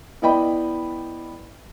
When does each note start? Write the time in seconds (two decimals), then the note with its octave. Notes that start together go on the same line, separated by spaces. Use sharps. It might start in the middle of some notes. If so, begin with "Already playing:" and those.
0.22 B3 E4 D5 D#5 G5 B5